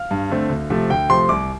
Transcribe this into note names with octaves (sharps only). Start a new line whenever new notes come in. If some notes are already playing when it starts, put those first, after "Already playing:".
Already playing: F5
G2
D3 A3 C4
D2
C3 F3 A3
D2 G5
C3 F3 A3 C6
C2 D6